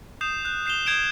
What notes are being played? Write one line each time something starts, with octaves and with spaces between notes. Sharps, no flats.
D#6 G6 C7 E7
F#6 G6
G6 C7 E7 F7 G7
D#6 G6 G#6 C7 D7 E7